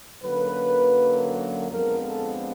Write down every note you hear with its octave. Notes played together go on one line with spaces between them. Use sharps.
F#2 D3 F#3 A#3 B4
F2 D3 F3 G#3 B3 A#4
A4